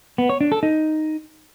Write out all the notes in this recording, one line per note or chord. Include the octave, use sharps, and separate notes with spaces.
B3
C#5
D4
A4
D#4